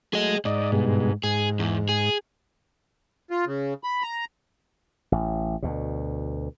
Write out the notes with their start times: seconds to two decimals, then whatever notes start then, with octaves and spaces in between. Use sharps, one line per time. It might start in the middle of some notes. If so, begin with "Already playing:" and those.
0.14 F#3 A3 G#4 D#5
0.45 G#2 D5 D#5
0.72 G2 B2 G#3
1.23 G#2 G#4
1.59 E2
1.89 G#4
3.31 F4
3.46 C#3
3.84 B5
4.03 A#5
5.12 A1
5.62 D2 B2